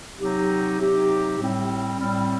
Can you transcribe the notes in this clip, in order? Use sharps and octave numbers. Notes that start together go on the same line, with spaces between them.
C3 F#3 C4 D#4 G4
C3 F#3 C4 D#4 G4
A2 G3 C4
A2 G3 C4